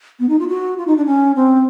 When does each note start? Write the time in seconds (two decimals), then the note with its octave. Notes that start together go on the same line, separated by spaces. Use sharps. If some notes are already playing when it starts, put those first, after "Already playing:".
0.20 B3
0.29 D#4
0.39 F4
0.49 F#4
0.78 F4
0.87 D#4
0.97 D4
1.06 C#4
1.36 C4